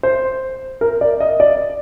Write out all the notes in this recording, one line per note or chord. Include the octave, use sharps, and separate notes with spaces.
C5
A#4
D5
D#5
D5